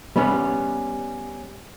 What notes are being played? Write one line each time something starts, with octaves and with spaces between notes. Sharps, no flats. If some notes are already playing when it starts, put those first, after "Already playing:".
G3 B3 C#4